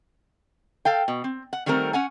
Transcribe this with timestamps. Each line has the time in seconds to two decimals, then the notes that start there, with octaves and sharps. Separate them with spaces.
0.85 A4 F5 G5
1.08 B2
1.24 C4
1.53 F#5
1.66 D#3 G3 A3 C4 A#4
1.93 C#4 F#5 G#5